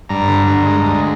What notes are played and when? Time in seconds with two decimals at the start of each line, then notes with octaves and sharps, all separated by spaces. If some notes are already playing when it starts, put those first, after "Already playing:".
0.09 G2 A#5
0.28 D3
0.47 G2
0.66 G#3
0.85 D2